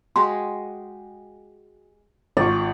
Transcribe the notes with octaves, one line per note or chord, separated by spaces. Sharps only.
G#3 F#4 G4 C6
G#1 F4 D5 C#6